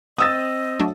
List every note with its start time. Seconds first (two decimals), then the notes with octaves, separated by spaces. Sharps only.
0.18 C4 D#5 D#6 E6 A6
0.80 F#3 A3 D4